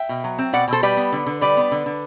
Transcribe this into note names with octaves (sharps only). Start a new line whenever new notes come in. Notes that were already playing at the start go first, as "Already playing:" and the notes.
Already playing: E5 G5
B2
F#3
C4
B2 D5 F#5
B2 A4 C5
G3 B4 D5
B3
D3
D3
G3 B4 D5
B3
D3
D3